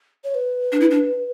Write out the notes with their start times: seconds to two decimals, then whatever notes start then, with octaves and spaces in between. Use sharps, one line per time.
0.24 C#5
0.35 B4
0.72 D4
0.81 E4
0.91 D4